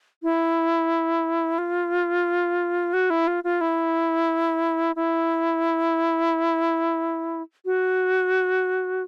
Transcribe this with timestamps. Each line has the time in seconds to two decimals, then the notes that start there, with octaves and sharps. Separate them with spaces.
0.23 E4
1.58 F4
2.93 F#4
3.10 E4
3.27 F4
3.44 F4
3.61 E4
4.96 E4
7.65 F#4